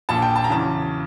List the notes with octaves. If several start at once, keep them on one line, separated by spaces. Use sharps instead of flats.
A#1 A#2 F3 A5
G5
A5
A#5
E2 C#3 E3 A5